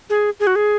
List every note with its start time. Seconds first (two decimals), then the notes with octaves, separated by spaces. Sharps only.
0.10 G#4
0.40 G#4
0.47 F#4
0.56 G#4